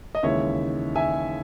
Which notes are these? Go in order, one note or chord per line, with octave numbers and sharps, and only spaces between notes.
D#5
D#2 C#3 E3 G#3 C#5 E5
E5 G#5